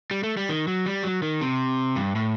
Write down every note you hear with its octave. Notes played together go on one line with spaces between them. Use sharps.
G3
A3
G3
D#3
F#3
G3
F#3
D#3
C3
G2
A2